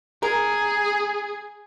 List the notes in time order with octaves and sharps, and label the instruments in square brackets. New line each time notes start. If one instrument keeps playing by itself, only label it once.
[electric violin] G#4 [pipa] A#4